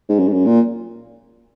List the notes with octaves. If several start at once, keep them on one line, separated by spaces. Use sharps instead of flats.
G#2
F#2
G#2
F#2
A#2